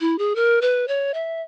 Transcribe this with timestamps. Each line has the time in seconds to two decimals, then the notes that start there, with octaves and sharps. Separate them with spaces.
0.01 E4
0.18 G#4
0.36 A#4
0.62 B4
0.88 C#5
1.14 E5